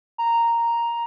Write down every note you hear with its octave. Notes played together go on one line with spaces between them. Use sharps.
A#5